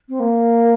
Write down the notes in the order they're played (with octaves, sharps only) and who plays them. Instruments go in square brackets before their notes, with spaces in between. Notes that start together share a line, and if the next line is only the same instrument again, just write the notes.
[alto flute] C4
A#3